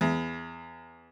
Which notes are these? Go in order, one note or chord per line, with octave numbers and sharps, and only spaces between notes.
E2